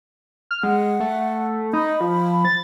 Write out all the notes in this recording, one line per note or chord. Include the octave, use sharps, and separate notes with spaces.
F6
G#3 F#5
A3
D#4 B5
F3
A6